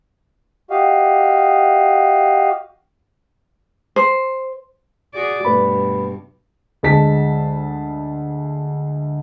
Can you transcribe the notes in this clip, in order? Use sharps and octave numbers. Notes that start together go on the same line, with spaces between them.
F#4 G4 D#5 F5
C5
F#4 G#4 D5
G2 B2 A3 B4 B5
D2 G#3 G#4 A5 B6